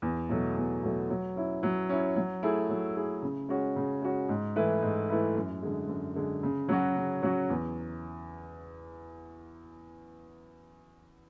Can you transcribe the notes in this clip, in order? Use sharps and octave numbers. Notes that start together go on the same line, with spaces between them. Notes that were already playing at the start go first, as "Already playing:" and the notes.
E2
B2 F#3 A3
E2
B2 F#3 A3
F#3
C#4 E4
F#3
C#4 E4
F#3
A3 E4 G#4
F#3
A3 E4 G#4
C#3
G#3 C#4 F#4
C#3
G#3 C#4 F#4
G#2
E3 A3 E4 B4
G#2
E3 A3 E4 B4
F#2
D3 G#3
F#2
D3 G#3
C#3
F#3 C#4 F#4
C#3
F#3 C#4 F#4
E2